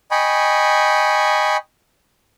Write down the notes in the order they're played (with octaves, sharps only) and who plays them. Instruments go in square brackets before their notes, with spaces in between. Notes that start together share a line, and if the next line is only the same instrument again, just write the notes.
[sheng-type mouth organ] D#5 G5 G#5 B5 C#6